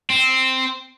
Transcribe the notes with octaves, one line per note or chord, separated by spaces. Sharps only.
C4